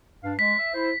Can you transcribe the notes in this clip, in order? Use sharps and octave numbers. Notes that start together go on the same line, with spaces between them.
G2 D4 F5
G#3 B6
E5
E4 C5